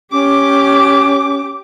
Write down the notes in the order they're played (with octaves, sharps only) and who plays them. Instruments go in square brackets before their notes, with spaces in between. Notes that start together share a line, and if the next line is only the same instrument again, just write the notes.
[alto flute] C#4 [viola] G4 D6